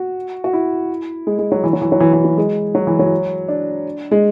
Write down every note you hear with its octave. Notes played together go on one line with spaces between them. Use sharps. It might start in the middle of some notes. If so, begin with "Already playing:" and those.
Already playing: F#4
F#4
E4
G#3
G#3
F#3
E3
F#3
E3
F#3
E3
E3
F#3
G#3
F#3
E3
F#3
D4
G#3